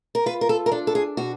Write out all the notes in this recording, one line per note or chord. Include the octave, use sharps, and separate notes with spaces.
A#4
F4 B4
A#4
A4
A#4
D4 A4
A4
G#4
B2 F#4